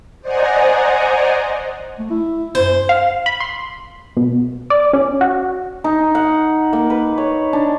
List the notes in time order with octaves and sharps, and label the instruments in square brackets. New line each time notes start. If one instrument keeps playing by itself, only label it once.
[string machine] C5 D5 D#5 F#5 G#5 A#5
[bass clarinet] A3
E4
[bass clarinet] F#2 [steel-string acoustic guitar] C5
[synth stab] F5
B5
C6
B2
D5
C#4
F#4
[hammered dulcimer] D#4
F#5
A#3
B4
C#5
D4